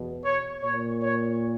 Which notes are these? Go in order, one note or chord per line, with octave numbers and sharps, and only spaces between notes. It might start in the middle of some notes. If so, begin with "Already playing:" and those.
Already playing: E2 B2
C#5
A#2 C#5
C#5